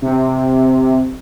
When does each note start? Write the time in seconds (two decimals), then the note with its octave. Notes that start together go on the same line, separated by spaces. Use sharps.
0.02 C3